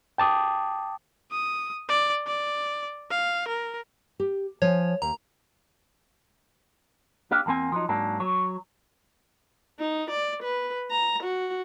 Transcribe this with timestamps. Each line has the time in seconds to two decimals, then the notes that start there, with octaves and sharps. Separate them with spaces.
0.18 G5 A5 D6 D#6
1.32 D#6
1.89 D5
2.26 D5
3.10 F5
3.48 A#4
4.20 G4
4.62 F3 C#5 G#5
5.02 D#2 A#5
7.31 A#3 D4 G4 F5
7.46 E2 A#2 A#3 C4 G#5
7.72 F3 F#3 D#4
7.89 G#2 F#3 A#3 D4
8.20 F#3 C#5
9.80 D#4
10.11 D5
10.43 B4
10.91 A#5
11.24 F#4